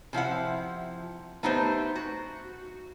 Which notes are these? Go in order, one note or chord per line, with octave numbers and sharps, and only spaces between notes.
C3 F3 E4 F#5
A3 B3 D#4 G4 A4 C5
F#4